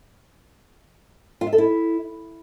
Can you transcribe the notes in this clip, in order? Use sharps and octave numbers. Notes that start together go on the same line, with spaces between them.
F4
E5
A4
E4